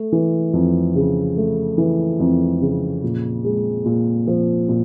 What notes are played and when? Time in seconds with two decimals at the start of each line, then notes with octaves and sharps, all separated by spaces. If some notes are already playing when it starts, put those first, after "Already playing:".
Already playing: A3
0.12 E3
0.54 F2
0.95 C#3
1.37 A3
1.78 E3
2.20 F2
2.61 C#3
3.03 A#2
3.44 G#3
3.85 A#2
4.27 F3
4.69 A#2